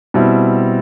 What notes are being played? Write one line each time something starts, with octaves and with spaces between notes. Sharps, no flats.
B2 G3 C4 E4